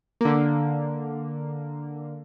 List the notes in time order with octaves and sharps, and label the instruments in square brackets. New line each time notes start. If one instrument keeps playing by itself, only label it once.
[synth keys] D3 A#3